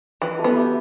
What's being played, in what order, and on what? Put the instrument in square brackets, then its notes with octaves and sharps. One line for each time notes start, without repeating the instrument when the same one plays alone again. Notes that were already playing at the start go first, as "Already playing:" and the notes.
[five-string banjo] E3 [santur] B4 D#5
[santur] F#4 A4
[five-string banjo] B3
[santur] E4 G4